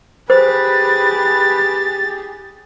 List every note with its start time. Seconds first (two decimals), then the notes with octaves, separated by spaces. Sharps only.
0.30 G4 G#4 B4 C5 A6